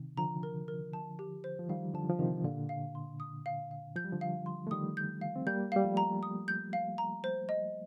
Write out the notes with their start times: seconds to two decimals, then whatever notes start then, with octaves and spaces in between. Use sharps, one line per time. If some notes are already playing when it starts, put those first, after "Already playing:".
Already playing: C3 D#3
0.17 D3 F3 A#5
0.43 A#4
0.68 A#4
0.93 A5
1.19 G4
1.44 C5
1.59 F3
1.69 D#3 G3 F5
1.94 D3 F3 A5
2.10 F3
2.19 C3 D#3 G4
2.44 A#2 D3 F5
2.69 F5
2.95 C6
3.20 D#6
3.46 F5
3.71 F5
3.95 F3 G6
4.04 G3
4.12 D3 F3
4.21 F5
4.46 C6
4.67 A3
4.71 D#3 G3 D#6
4.97 G6
5.21 F5
5.36 C4
5.47 G3 A#3 G6
5.72 G3 F5
5.85 F3 A3
5.97 A#5
6.23 D#6
6.48 G6
6.73 F5
6.98 A#5
7.24 C5
7.49 D#5